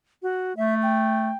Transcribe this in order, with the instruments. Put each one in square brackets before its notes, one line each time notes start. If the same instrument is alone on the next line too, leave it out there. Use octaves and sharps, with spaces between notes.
[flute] F#4
[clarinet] A3 [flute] E5
[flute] G5